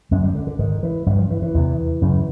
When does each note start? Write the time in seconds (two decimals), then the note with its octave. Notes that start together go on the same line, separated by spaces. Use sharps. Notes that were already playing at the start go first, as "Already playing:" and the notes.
0.11 F#2 D3 G#3
0.23 G3
0.35 D3
0.47 D3
0.59 G#2 D#3
0.83 E3
1.06 G2 F3
1.10 D3
1.18 F3
1.30 E3
1.42 E3
1.54 E2 C3
2.02 F#2 C#3